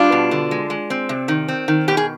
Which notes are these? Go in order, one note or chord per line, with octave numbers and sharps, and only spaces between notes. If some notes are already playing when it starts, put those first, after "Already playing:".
Already playing: G3 D4 F4
B2
D3
G#3
G#3
C4
C3
D#3
C4
D#3
B2 G4
G#4